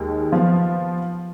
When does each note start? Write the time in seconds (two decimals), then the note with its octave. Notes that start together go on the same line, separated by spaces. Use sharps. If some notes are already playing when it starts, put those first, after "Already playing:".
Already playing: D#2 D#3 G#3
0.32 F3 B3 F4